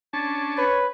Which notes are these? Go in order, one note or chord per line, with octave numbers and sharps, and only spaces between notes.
C#4 D4 A5
B4 C#5